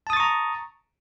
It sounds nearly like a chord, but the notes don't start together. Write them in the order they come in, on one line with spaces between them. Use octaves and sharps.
A5 D#6 A6 C#6 A#5